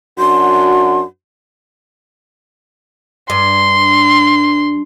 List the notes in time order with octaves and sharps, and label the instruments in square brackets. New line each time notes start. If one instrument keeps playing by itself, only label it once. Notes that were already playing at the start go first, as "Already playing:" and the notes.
[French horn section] F#2 D4 F#4 [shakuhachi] C6
[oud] G2 [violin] C6